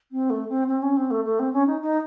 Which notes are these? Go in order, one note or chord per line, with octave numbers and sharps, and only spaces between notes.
C4
A3
C4
C4
C#4
C4
A3
A3
C4
C#4
D#4
D#4